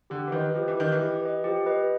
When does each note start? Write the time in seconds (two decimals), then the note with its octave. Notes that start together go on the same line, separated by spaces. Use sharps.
0.10 D3 G4
0.27 E3
0.32 D#3 B4 D#5
0.54 F3 G4
0.68 E3
0.77 D#3 B4 D#5
0.92 E3
0.99 G4
1.21 B4 D#5
1.44 F3 G4
1.66 B4 D#5